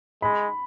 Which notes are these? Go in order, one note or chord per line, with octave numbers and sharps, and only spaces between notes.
G#3 B5